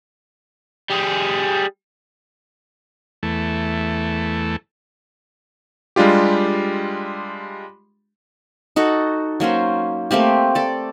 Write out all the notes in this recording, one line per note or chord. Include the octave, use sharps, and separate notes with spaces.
G3 G#4
E2 A3
G3 G#3 D4 F4 G4
D#4 F#4 A4 F#5
F#3 A#3 C#4 C5
A3 A#3 C4 G4
A4 D5